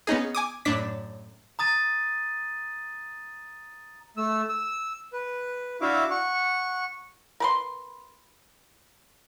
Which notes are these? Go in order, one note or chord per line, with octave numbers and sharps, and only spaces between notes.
B3 C#4 D#4 G#4
G#5 D6 D#6
F#2 A2 D4 B6
A#5 D#6 A6 D#7
A3 E6
E6
B4
D4 E4 F#4 E5 F5 D6
F#5 C#6
A#4 B4 C6